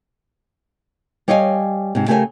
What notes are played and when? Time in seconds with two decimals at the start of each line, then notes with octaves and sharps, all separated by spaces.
1.28 G3 C#5 D#5 F5 G5 G#5
1.95 G#2 C3
2.08 C#3 A3 G4 A#4 D5 G#5